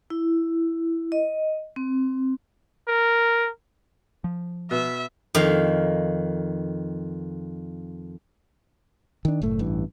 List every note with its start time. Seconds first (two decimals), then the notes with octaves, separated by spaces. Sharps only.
0.10 E4
1.12 D#5
1.76 C4
2.88 A#4
4.24 F3
4.71 B2 E5
5.35 F2 D#3 F5
9.25 D#3 D4
9.42 F#1 A2 A3
9.59 A1 G2 E3